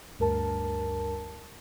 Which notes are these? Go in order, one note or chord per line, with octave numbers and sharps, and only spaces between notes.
D2 G2 A#4 A5